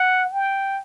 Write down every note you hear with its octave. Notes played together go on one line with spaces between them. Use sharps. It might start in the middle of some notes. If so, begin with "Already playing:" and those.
Already playing: F#5
G5